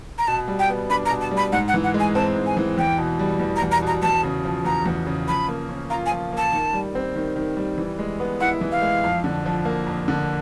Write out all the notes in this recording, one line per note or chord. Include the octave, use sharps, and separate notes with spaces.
A#5
B2 A5
G3
G5
B3
D4 B5
A#5
B2
A5
G3
B5
G#2 F#5
F#5
E3
F#5
G#3
G#5
C4 A5
G#2
G#5
E3
E2 G5
B2
G3
E2
A#5
E2
A#5
B2 A#5
E2 A5
C#3
F3
E2 A#5
E2
C#3
F3 B5
A#3
C#4
F4 A#5
G#5
F3
A#3 A5
D#3
G3
C4
D#3
D#3
G3
E3
G#3
B3
E4 F#5
E3
F5
G#3
F2
D3
F3
A#3
F2
D3